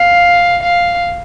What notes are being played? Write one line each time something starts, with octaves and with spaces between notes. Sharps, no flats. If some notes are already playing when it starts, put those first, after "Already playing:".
Already playing: F5
F5